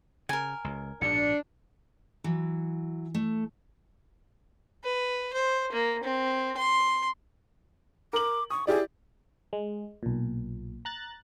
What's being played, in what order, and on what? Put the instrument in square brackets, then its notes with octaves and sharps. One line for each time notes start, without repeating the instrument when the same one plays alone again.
[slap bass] C#3 [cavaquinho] A#4 G#5
[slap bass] C#2
[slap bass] A#1 G#2 B2 [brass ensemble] D4 [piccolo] C#7
[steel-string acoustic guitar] E3 F#3
A3
[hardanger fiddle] B4
C5
A#3
C4
C6
[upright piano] A#4 F#7 [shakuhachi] D6
[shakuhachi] C#6 [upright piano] D#6
[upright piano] E4 G4 D5 [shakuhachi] G#4
[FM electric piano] G#3
B1 A#2
A#5 F#6 A6